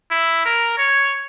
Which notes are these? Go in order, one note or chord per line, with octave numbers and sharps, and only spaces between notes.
E4
A#4
C#5